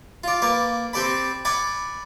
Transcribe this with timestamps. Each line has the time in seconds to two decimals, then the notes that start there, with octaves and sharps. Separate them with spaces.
0.24 F4 D5
0.42 A#3 B4 D5
0.93 C4 G4 A4 D5 A5 B5
1.45 D5 F#5 G#5 B5 D6